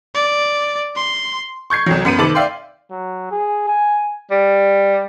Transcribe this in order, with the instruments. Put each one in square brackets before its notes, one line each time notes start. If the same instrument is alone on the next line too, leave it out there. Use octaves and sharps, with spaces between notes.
[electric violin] D5
C6
[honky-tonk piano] C#6 G6 G#6 C7
C2 F2 F#3
F#2 B3 B5 D#7
C3 D#3 A4 B4 D6 F#7
D5 E5 F5 G5 C6
[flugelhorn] F#3
G#4
G#5
[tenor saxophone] G3